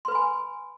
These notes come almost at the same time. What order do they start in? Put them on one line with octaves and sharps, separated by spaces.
C6 B4 B5 G#5